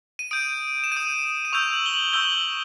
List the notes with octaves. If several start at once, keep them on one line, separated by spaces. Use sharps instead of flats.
D#7
D#6 G6 D7
E7
D#6 G6 D#7
E7
C#6 E6 G6 F7
F#7
G7
F#7
C#6 E6 G6 G7